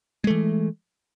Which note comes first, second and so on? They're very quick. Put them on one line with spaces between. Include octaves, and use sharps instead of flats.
G#3 A3 E3